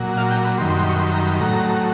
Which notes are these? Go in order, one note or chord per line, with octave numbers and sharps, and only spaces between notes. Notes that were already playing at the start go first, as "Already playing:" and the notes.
Already playing: A#2 F#3
F5
G5
B5
F#2 D#3 G3 C6
C6
C6
C#6
C6
A#5
B5
A2 F#3 A#5